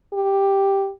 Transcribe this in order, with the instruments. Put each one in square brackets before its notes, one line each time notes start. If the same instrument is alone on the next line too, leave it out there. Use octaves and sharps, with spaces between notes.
[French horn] G4